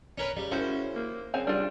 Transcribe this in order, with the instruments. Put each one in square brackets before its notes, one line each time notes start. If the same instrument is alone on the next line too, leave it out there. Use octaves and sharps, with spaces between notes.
[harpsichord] C#4 A#4 B4
[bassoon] C#3 [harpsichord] G3
[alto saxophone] C#4 [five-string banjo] E4 F#4 A#4 [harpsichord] C5
[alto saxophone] A#3
[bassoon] C#3 [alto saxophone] C4 [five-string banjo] F#5 G#5 A#5
[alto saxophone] G3 [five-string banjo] D4 F4